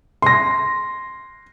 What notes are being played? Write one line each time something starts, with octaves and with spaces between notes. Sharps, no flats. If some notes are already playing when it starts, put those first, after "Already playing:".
C6 A#6